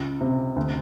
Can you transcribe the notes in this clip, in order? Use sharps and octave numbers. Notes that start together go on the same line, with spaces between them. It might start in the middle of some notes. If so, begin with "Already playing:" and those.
Already playing: C#2
C3
D2